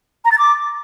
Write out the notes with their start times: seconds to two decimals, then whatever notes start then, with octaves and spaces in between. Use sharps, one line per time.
0.24 A#5
0.31 A6
0.38 D6